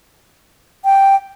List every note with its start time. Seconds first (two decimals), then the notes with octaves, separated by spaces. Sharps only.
0.85 G5